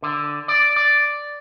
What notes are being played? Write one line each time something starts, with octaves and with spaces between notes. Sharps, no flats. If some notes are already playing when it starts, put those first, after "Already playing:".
D3
D5
D5